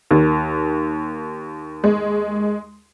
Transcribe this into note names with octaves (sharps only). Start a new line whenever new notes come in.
D#2
G#3